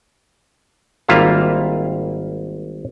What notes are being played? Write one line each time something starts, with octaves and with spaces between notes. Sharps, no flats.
G#1 G3 A#3 F4 E5 F5